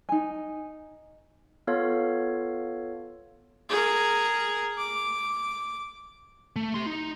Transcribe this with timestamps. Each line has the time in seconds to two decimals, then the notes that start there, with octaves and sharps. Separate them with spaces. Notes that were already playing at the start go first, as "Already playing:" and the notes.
0.09 D#4 G#5
1.67 B3 F4 A4 C#5 F5
3.70 G#4 A#4
4.78 D6
6.56 A3
6.74 G4 C6
6.87 D#4